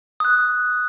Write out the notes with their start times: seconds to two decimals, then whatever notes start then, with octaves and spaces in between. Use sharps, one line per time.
0.20 D#6 F#6